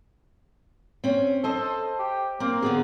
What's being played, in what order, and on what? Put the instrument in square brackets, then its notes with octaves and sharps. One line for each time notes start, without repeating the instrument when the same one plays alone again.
[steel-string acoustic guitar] C4 C#4
[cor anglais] A4 [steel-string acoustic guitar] C5 D#5
[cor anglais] G4
[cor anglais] A#3 [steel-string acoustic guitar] C4
[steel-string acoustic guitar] D3 B3 G#4